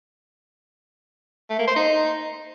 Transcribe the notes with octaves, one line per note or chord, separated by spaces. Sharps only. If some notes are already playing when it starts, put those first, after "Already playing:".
A3
A#3
C5
D#4